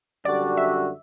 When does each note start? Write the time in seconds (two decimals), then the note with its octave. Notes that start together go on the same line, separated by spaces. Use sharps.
0.25 F#2 D3 G3 D4 F#4 D5
0.57 E5